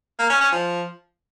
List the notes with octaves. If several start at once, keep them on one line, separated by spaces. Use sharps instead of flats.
A#3
C#4
C#4
F3